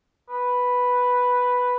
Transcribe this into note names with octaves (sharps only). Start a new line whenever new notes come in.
B4